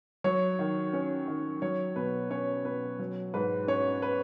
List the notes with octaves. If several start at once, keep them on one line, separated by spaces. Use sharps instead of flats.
F#3 C#5
D#3
C#4
D#3
F#3 C#5
B2 B4
C#4 C#5
B2 B4
F#3
G#2 B4
C#4 C#5
B4